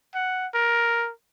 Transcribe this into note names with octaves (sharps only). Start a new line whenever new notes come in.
F#5
A#4